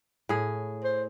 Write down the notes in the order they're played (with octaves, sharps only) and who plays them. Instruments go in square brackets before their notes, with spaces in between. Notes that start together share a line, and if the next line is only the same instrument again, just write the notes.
[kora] A2 G#4
[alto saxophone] C5